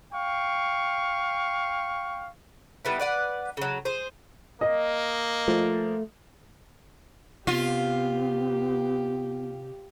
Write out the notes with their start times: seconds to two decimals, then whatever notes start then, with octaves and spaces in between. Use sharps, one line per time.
0.13 F5 G5 C#6
2.85 G3 B3 E4
2.99 B4 D5 F#5
3.57 C#3 F#3
3.85 G#4 C5
4.61 A#3 D#5
5.48 F3 A3
7.47 C3 B3 F4 G4